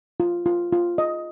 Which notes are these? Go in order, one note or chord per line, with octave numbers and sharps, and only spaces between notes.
F4
F4
F4
D#5